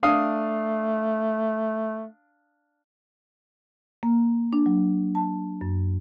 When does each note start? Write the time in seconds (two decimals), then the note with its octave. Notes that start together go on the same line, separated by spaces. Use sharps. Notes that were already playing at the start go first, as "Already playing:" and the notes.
0.03 A3 D4 F5 D#6
4.03 A#3
4.53 D4
4.66 F#3
5.15 A5
5.61 F#2